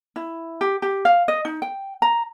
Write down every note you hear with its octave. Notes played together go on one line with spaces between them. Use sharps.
E4
G4
G4
F5
D#5
D#4
G5
A#5